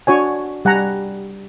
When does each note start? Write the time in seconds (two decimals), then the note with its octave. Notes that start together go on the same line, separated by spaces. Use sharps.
0.07 D4 F#4 C#5 G#5
0.65 G3 F#5 G#5 A#5